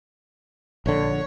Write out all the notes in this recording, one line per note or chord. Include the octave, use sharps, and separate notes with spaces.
A#1 D3 C#5